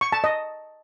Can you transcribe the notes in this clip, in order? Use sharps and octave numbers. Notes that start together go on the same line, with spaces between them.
C#6
A5
D#5